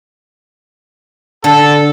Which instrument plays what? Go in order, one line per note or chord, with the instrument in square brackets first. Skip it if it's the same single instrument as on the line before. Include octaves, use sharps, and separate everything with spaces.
[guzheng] D3 [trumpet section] A4